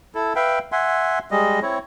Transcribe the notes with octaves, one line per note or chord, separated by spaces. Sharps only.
E4 A4
B4 E5 F5 G5
E5 F#5 G#5 C6
G3 G#3 D#5
C4 E4 C#5